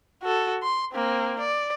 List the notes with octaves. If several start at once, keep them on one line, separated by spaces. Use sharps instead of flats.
F#4 A4
C6
A#3 C4
D5